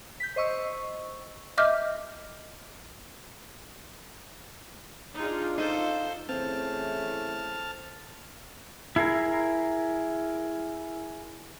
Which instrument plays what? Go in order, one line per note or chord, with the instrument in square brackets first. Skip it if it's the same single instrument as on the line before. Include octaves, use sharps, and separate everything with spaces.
[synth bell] G6 B6
C5 D#5 C#6 E6
[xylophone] D#5 E5 D6 F6 G6
[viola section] D4 F4 [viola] D#4 G#4
[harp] C#4 F5 [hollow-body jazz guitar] D#4 [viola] A4 C5
[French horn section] C#3 E3 A3 [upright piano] C4 [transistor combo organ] A5 F6
[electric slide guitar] E4 G#4 A#4